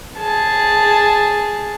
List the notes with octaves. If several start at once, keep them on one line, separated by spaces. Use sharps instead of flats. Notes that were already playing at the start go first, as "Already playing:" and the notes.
G#4 A5